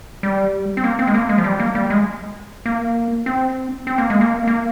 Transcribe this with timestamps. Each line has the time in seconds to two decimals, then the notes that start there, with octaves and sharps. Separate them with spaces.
0.23 G3
0.77 C4
0.84 A#3
0.99 C4
1.07 G#3
1.15 A#3
1.29 G#3
1.38 F3
1.44 G3
1.60 A#3
1.75 G3
1.90 G#3
2.66 A#3
3.26 C4
3.87 C4
3.98 A#3
4.10 G#3
4.21 A#3
4.47 A#3